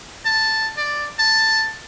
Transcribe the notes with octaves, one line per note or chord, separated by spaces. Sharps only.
A5
D5
A5